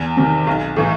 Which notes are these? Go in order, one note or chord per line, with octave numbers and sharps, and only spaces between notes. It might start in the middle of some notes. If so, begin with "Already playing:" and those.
Already playing: E2
C3 D#3
B1
A2 E3